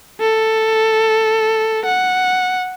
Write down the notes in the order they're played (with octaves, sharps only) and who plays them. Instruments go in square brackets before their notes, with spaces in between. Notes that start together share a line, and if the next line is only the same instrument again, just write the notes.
[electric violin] A4
F#5